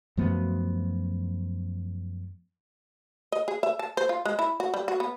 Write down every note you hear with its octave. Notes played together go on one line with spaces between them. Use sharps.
F#2 F3 A3 B3
D#5
G#4
E5
A5
C5
F4
G#3
E4
F#4
G3
F#4
B3